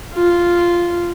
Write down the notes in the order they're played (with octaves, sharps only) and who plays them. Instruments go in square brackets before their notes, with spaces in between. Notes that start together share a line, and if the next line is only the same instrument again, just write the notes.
[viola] F4